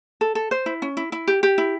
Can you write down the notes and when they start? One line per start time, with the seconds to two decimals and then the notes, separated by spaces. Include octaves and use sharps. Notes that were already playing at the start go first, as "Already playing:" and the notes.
0.21 A4
0.35 A4
0.51 C5
0.66 E4
0.82 C#4
0.97 E4
1.12 E4
1.27 G4
1.43 G4
1.58 E4